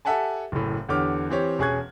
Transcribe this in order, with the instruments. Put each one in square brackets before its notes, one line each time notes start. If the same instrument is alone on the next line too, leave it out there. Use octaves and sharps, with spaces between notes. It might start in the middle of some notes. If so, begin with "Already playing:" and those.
[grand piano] G4 A4 E5 F#5 G#5 A5
F#1 A2
E2 D3 G4 C#5 D6 F6
E3 C4 G4 C#5
E1 C#4 G#4 C#6 F#6 G#6